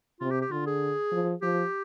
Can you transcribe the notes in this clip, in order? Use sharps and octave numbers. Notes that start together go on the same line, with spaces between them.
C3 F4
G4
G4
D3 F4
G#4
F3
F3 G4